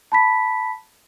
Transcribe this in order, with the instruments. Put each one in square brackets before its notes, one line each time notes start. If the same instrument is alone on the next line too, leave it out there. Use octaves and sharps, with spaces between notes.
[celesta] A5 B5 B6